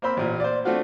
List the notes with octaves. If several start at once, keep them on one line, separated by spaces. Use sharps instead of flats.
A#3 C4 C5 B5 E6
A1 A#2
C5 D5
A3 C4 D4 F4 F#4